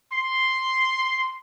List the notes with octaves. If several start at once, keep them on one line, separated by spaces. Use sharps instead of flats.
C6